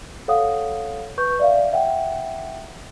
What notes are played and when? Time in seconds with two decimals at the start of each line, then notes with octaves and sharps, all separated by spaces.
0.28 A4 C#5 F5 F#5 D#6
1.18 B4 C#6 G6
1.39 D5 E5 F5
1.73 E5 F#5 G5